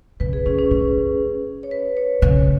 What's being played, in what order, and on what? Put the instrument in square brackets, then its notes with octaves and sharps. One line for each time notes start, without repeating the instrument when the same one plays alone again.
[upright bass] C#3 [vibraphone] B4
[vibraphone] G#4
[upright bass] C#3 [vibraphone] C#4
[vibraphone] C#4
[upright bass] G#2 [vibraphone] C#4
[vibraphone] C#5
B4
C#5
[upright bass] C#3 [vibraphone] C#5